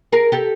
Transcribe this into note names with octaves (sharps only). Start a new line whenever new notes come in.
G#4 A#4
G4 A4